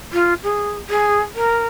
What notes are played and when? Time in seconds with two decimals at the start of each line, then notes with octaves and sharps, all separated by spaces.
0.13 F4
0.43 G#4
0.90 G#4
1.35 A#4